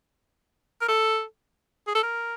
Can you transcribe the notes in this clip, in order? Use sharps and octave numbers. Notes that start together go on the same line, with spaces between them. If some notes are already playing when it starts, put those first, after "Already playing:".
A#4
A4
G#4
A4
A#4